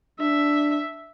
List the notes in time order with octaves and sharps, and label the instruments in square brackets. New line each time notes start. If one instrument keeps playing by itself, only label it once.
[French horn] D4 [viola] E5